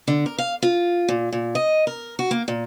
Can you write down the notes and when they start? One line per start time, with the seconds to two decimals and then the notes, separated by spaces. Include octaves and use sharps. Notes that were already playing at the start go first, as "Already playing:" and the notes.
0.08 D3
0.26 A#4
0.38 F5
0.62 F4
1.09 A#2
1.32 A#2
1.55 D#5
1.87 A#4
2.19 F#4
2.31 A#3
2.48 A#2